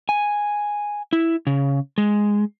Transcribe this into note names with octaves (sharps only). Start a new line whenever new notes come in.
G#5
E4
C#3
G#3